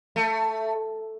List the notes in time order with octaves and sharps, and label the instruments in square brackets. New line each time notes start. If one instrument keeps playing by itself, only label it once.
[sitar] A3